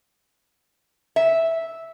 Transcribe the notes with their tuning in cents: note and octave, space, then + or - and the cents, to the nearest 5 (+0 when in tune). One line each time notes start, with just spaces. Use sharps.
E5 -5